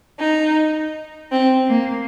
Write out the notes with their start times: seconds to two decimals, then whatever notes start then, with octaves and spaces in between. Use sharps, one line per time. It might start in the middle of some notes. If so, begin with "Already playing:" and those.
0.19 D#4
1.31 C4
1.68 A#3